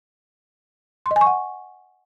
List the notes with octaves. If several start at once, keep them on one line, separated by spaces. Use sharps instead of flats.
C6
D#5
G#5
C#6
F#5